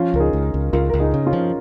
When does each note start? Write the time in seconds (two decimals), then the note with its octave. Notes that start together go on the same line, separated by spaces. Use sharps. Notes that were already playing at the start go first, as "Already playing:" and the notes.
Already playing: F3 C#4 F4
0.14 C#2 A#4
0.20 D#4 G#4
0.33 C#2
0.54 C#2
0.73 C#2 F4 A#4
0.90 C#2 A#4
1.00 D#4 G#4
1.14 C#3
1.27 C#4 F4
1.33 F3